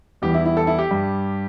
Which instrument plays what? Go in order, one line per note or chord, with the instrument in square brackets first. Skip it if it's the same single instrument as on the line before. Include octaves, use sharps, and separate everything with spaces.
[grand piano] E2 E3 G3 G4
E4
E4
A4
E4
G4
G2 G3